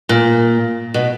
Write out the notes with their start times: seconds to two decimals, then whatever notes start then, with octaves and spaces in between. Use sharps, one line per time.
0.09 A#2
0.94 B2